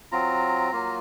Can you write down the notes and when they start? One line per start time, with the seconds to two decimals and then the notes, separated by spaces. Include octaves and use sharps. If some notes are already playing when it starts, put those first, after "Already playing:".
0.12 F#3 C4 F4 A#5
0.72 F#3 A#3 F4